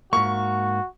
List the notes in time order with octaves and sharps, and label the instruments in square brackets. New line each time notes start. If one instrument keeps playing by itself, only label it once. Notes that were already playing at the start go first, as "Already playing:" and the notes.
[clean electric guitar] G#2 A#3 [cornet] F#4 [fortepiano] C#6